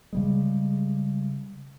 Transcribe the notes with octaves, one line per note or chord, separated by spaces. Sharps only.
C#3 G3 G#3